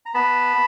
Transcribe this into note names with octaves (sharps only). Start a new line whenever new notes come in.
A#5
B3 A5 B5